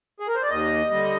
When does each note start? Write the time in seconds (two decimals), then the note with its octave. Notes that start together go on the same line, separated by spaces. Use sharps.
0.20 G#4
0.28 A#4
0.35 C5
0.43 D5
0.50 D#2 D#5
0.91 D3 G3